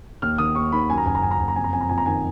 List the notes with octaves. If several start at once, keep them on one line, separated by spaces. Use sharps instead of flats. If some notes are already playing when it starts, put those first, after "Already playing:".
D#2 F6
D#3 D#6
D#2 C#6
D#3 B5
F#2 G#5
A#5
F#1 G#5
A#5
F#1 G#5
A#5
F#1 G#5
A#5
F2 G#5
A#5
F2 G#5
A#5
F2 G#5
A#5
D#3 G#5